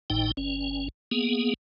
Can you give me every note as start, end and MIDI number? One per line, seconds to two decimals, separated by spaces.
0.10 0.31 32
0.10 0.31 45
0.10 0.31 63
0.10 0.31 79
0.37 0.88 31
0.37 0.88 61
1.11 1.54 58
1.11 1.54 59
1.11 1.54 68